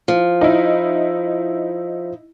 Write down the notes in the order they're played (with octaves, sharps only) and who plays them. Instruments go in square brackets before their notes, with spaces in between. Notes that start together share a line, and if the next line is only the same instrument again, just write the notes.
[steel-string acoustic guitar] F3
[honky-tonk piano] D#4 E4